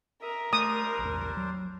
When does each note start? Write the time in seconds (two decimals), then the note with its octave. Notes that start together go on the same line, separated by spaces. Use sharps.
0.22 A#4 E5 D#6
0.53 G3 A3 D4 C5 D#6
0.99 A#1 E2
1.37 F#3